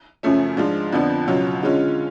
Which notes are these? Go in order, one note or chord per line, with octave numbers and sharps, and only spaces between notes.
F#2 C#3 F3 A3 C#4
G#2 F3 G#3 D4 F4
F2 D3 F3 B3 D4
C#2 B2 F#3 C#4 F4
D3 G#3 C#4 F4